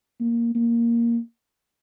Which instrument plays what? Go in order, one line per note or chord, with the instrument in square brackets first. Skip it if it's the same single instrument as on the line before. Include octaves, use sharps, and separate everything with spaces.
[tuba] A#3
A#3